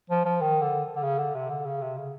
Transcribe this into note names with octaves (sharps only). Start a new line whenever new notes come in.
F3
F3
D#3
D3
D3
C#3
D3
C3
D3
C#3
C3
C#3